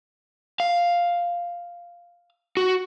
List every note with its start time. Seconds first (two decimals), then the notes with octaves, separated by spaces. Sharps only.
0.60 F5
2.57 F#4